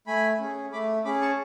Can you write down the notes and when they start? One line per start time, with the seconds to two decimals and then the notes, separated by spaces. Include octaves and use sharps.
0.07 A3 G#5 B5
0.40 C#4 G#4
0.72 A3 B5 D6
1.05 C#4 G#4 B5 D6
1.21 A5 C#6